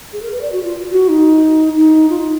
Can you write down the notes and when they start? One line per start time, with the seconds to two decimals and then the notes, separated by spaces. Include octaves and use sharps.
0.13 G#4
0.22 A#4
0.32 B4
0.41 D5
0.52 F#4
0.64 F4
0.92 F#4
1.09 D#4
1.76 D#4
2.10 F4
2.20 D#4